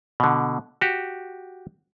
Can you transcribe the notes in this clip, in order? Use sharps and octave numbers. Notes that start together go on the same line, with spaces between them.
B2 D3
F#4 G4